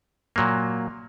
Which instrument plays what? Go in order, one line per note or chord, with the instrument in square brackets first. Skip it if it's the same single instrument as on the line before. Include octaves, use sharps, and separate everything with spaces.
[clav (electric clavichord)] A#2 F#3 A#3